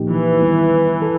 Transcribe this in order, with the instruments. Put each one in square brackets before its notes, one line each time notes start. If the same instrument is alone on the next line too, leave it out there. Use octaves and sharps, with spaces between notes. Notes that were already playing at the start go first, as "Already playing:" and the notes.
Already playing: [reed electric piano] A#2 F3 A#3 D#4 G4
[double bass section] E3
[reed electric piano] D#3 G3 B3
A4